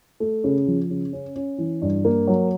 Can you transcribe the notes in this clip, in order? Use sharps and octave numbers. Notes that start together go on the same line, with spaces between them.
A3
C#3
F3
C#3
C#4
C#4
E3
G2
A#3
F#3